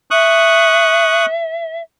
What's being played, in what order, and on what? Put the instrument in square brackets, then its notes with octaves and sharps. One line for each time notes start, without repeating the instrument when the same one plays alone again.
[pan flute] E5 [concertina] C#6 D#6 F#6